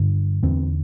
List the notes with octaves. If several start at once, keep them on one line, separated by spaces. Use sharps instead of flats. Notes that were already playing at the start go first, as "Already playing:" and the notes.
Already playing: G2 D3
E2 D3 C4